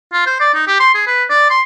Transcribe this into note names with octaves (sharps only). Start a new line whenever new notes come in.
F4
C5
D5
D#4
G4
C6
G#4
B4
D5
C6